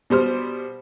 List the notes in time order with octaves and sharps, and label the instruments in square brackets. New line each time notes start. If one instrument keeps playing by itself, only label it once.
[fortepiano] B2 G3 C5 F6